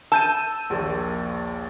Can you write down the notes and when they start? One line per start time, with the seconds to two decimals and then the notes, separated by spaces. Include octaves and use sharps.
0.12 A5 E6 G6 D#7
0.70 A#1 D#2